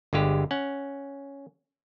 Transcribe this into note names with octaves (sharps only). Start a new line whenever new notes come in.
G1 D3 G#3 G4
C#4 F#5